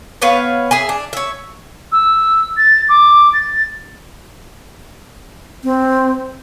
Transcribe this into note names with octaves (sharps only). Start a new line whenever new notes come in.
B3 B4 C#5 F5
G#4 E5 G#5
D4
C#5 E5
E6
A6
D6
A6
C4